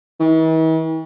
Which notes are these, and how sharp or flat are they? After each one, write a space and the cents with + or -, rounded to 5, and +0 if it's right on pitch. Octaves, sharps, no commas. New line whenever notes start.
E3 -45